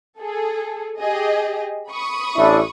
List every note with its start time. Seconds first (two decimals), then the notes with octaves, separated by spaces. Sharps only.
0.19 G#4 A4
0.99 G4 G#4 D#5
1.90 B5 C#6 D#6
2.36 A1 D4 E4